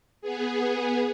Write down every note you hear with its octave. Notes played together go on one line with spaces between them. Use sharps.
B3 G#4